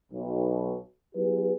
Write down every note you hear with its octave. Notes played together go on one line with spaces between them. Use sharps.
B1
F#3 B3 E4 G4 G#4 B4